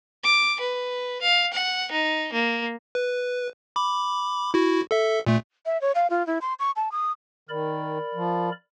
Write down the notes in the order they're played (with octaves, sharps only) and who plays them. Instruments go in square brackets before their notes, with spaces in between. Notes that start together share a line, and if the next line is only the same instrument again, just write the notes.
[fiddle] D6
B4
F5
F#5
D#4
A#3
[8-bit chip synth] B4
B5 D6
E4 F#4
A4 E5
A#2 A3
[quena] E5
C#5
F5
F4
E4
C6
C#6
A5
D#6
[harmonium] D#3 [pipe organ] A#4 D5 B5
[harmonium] F3